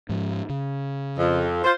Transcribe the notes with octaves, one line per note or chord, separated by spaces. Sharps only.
G#2 F3
C#3
F2
F4 C5